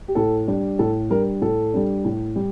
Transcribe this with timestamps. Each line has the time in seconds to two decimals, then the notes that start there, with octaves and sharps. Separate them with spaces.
0.08 G4
0.15 A2 A4
0.48 G3 D4
0.79 A2 A4
1.10 G3 D4 A#4
1.42 A2 A4
1.74 G3 D4
2.05 A2
2.36 G3